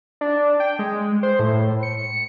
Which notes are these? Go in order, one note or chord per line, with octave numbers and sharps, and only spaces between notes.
D4
G5
G#3
C5
A2
C#7